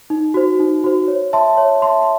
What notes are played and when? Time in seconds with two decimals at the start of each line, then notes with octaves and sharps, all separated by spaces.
0.10 D#4
0.34 F#4 C5
0.60 D#4
0.84 F#4 C5
1.08 C#5
1.33 E5 A5 C6
1.57 C#5
1.82 E5 A5 C6